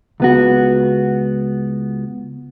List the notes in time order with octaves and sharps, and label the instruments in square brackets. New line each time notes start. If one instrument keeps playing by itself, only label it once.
[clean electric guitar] C#2 B3 F#4